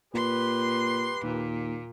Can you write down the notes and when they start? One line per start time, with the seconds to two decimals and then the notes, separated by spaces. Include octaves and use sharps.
0.14 A#2 G4 B4 C6
1.23 D#2 A#2